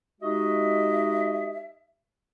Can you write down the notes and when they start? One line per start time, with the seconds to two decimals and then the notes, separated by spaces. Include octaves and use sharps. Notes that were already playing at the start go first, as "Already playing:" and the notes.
0.21 G#3 D#4 F#4 G4 D#5 E5